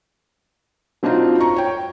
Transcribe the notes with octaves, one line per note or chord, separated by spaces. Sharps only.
F#3 C4 D4 D#4 F4
A#5 C#6
C#5 G5